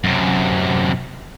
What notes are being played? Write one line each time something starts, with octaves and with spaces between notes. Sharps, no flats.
F#2 C3